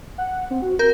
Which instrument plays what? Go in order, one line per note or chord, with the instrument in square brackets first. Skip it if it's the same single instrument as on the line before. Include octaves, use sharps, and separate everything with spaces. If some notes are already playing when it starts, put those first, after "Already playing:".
[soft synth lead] F#5
C4
F#4
[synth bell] A#4 [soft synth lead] G6